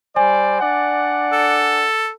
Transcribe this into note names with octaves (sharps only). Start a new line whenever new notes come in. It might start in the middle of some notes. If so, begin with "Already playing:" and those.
G3 C5 D5 G#5
D4 D5 F#5
A4